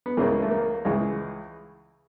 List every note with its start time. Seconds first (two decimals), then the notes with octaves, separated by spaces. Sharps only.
0.06 B3
0.17 C#2 C#3 E3 A#3
0.42 A3
0.51 A#3
0.85 C#2 C#3 E3 G#3